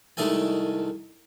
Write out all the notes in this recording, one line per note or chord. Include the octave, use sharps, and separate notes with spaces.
C2 D#3 G#3 A3 A4 G#5